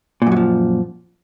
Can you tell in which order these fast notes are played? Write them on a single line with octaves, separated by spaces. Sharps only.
A#2 F#2 F#3 F3